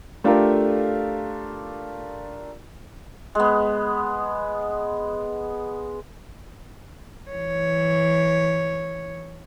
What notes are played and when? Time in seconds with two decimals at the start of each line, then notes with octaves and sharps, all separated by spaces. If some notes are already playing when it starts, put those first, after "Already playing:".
0.24 A3 D4 F4 G4 A4 A#4
3.35 G#3 B3
7.32 E3 C#5